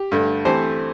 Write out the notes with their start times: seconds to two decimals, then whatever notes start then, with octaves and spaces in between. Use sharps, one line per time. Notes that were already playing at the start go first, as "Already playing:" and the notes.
Already playing: G4
0.12 G2 D3 A3
0.45 E3 A3 C4 G4 A4 C5